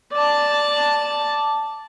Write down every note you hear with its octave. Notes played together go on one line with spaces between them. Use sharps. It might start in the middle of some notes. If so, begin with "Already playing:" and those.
D5 A5